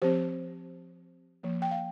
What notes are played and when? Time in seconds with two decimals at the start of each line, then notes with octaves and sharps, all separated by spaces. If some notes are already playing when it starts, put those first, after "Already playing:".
0.02 F3 C4 G4 C5
1.43 F3 A#3
1.62 G5
1.71 F5